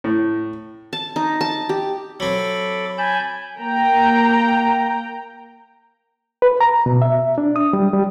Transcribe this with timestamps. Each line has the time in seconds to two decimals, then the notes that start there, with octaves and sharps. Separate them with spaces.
0.04 A2
0.93 A5
1.16 D#4
1.41 A5
1.69 G4
2.20 F#3 C4 A4 B5 D6
2.98 G#5 A5 B5 G6
3.57 A#3 G5 A#5
6.42 B4
6.61 A#5
6.86 B2
7.02 E5
7.38 D4
7.56 D#6
7.73 G3
7.93 G3